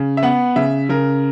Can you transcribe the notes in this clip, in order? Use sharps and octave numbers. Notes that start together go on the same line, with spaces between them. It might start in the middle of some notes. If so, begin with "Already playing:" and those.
Already playing: C#3
E5
B3 F#5
C#3 E5
C#3 A#4